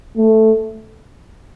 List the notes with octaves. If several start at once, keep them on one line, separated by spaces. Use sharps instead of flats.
A3